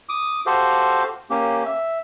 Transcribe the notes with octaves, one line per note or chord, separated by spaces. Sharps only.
D6 D#6
F#4 G4 A4 C5 F5
A#3 C#4 G4
E5